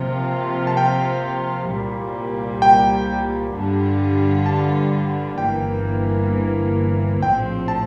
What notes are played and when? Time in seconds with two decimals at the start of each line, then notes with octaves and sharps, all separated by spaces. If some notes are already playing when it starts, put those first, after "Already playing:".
Already playing: C3 F3 A#3 F4
0.67 A5
0.77 G5
1.69 C2 A#2 G3 A#3
2.62 G5
3.54 G2 D3 G3 D4 F4
4.46 A5
5.38 G1 G2 E3 A#3 G5
7.22 A#1 A2 F3 C4 G5
7.68 A5